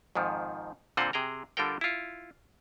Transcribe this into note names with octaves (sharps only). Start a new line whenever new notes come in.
F2 G#2 D#3 F3
A#2 D3 C4 F4 C5 F#5
C3 G#4 G5 A#5
D3 G3 F4 A4 A#4 G5
E4 F4